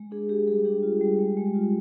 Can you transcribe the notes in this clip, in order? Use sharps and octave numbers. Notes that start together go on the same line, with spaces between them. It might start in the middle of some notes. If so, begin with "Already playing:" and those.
Already playing: G#3
D4 G#4
D4 G4
G3 G#4
D4 G4
F4
G3
G#3
G#3
F4